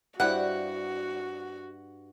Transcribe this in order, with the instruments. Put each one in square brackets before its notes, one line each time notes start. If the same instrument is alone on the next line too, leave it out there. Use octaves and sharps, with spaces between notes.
[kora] G2 E4 [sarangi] F#4 [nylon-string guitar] C5 D5 [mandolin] F#5